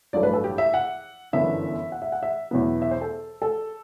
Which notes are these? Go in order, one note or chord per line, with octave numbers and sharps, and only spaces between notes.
A1 G2 F#3 A3 D5
B4
A4
G4
E5
F#5
G1 F#2 E3 B3 D4 E5
F#5
E5
F#5
E5
E2 B2 F#3 B3
E5
C5
A4
A4